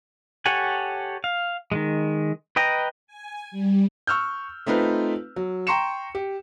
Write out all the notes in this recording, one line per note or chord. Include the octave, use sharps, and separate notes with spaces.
G4 A4 C#5 F#5 G#5
F5
D#3 F3 G#3
B4 D#5 G5 A#5
G#5
G3
C#6 E6 F6 G6
A3 C4 D#4 F4 B4
F#3
G5 A#5 C6 C#6 C#7 E7
G4